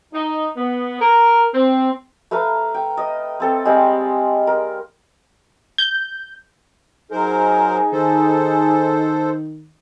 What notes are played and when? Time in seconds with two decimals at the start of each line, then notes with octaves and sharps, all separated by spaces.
0.13 D#4
0.56 B3
1.00 A#4
1.53 C4
2.31 A3 B4 F5 A#5
2.74 G5
2.97 D#5
3.40 C4 A4
3.65 G3 G#3 C4 F5
4.47 A#4
5.78 G6
7.11 F#3 D#4 G#4 A#4 C5
7.92 D#3 A4 C5